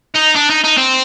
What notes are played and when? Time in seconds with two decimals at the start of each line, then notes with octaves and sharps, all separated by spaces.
0.14 D#4
0.35 D4
0.50 D#4
0.64 D#4
0.77 C4